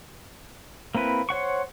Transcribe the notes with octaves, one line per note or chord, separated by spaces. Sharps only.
A#3 C4 E4 B4
C5 C#5 F#5 C#6